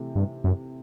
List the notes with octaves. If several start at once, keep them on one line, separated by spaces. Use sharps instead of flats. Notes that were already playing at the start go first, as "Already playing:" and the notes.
Already playing: C3 E3 A3 G4
G2
F#2